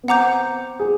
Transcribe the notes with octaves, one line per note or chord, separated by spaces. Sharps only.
B3
C4 F#5 A#5 D6 G6
G#4